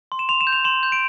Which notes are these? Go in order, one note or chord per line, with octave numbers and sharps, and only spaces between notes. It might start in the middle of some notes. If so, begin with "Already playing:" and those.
C6
E7
C6 F7
E7
G6
F7
C6 E7
G6
D7